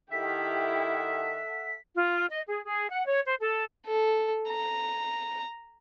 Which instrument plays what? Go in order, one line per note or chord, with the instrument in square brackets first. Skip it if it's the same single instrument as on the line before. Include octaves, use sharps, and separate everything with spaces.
[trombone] D#3 [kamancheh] E4 G4 [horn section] A4 E5 F#5 [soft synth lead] B6
[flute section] F4
D#5
G#4
G#4
F#5
C#5
C5
A4
[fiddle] A4
A#5